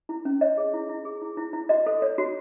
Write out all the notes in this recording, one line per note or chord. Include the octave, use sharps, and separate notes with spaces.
E4
C#4
C#5 D#5
G#4
E4
E4
G#4
E4
E4
E4
F#4 D#5
A4
C#5
F#4